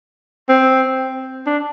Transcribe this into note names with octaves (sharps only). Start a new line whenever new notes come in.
C4
D4